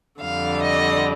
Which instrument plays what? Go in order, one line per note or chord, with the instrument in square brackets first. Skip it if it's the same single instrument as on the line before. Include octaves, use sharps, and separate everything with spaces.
[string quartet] F2 D3 G3 F5
D#5